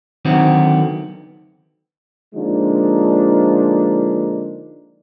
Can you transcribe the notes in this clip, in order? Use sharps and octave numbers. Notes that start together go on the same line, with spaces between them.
D3 D#3 F#3 A3 B3 C4
D3 F3 G#3 A#3 D4 D#4